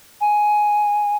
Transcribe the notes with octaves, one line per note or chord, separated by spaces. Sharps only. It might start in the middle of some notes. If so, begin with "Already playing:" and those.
G#5